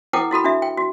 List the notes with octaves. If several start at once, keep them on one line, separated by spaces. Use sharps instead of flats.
E4 A4 B4 F#5 G5 D6
E4 F#4 A4 B5
D4 F#4 E5
G5
F#4